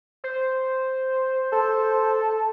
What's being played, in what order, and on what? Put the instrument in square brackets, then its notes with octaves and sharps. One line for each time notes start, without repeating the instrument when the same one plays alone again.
[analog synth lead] C5
[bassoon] A4